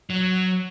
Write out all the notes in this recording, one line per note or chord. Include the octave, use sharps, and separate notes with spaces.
F#3